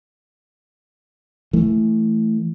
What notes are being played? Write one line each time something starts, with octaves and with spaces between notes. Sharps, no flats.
E3 A3